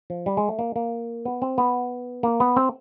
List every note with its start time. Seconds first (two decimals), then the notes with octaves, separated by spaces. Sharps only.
0.10 F3
0.26 G3
0.37 G#3
0.49 A3
0.59 A#3
0.76 A#3
1.25 B3
1.42 C4
1.58 B3
2.23 A#3
2.40 B3
2.57 C4